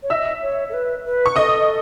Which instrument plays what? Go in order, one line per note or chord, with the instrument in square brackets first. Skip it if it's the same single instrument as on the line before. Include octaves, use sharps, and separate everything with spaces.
[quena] C#5
[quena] D#5 [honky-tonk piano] E5 E6
[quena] C#5
A4
B4
B4
[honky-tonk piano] C#6
[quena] A4 [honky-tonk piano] D#5 D#6